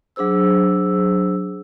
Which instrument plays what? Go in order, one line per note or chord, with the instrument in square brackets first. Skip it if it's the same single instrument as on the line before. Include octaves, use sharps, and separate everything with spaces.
[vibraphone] F#3 D4 G#4 C5 E6